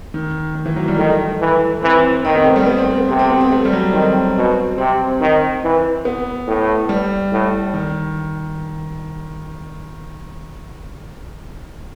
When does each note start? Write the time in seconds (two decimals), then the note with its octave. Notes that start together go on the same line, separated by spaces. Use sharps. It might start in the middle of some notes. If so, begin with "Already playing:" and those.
0.14 D#3
0.55 D#3
0.66 E3
0.76 F#3
0.88 G3
0.98 D#3 A3
1.40 E3
1.82 E3 C4
2.24 D#3 C4
2.35 B3
2.46 A3
2.56 G3
2.66 B3
2.78 C4
2.88 A3
2.98 B3
3.09 C3 C4
3.19 C4
3.30 B3
3.41 C4
3.52 A3
3.65 G3
3.73 F#3
3.93 D#3 C4
4.36 B2
4.78 C3 C4
5.21 D#3
5.63 E3
6.05 B3
6.47 A2
6.89 G3
7.32 A2
7.74 D#3